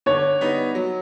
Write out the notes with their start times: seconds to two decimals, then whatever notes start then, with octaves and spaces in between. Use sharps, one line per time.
0.06 D3 C#5
0.41 G3 B3 D#4
0.75 F#3